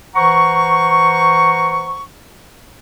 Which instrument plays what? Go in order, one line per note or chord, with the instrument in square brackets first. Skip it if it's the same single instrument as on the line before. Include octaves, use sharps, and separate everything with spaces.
[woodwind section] E3 C5 F#5 A#5 C#6